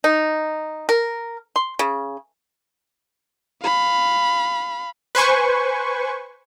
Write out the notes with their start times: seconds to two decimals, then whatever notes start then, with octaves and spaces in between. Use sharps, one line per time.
0.04 D#4
0.89 A#4
1.56 C6
1.79 C#3
3.62 F5 B5
5.15 B4 C5 G#5 C#6